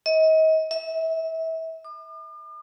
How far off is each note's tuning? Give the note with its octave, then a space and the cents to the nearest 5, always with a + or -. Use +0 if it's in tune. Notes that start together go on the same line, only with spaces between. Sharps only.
D#5 +35
E5 -30
D6 +45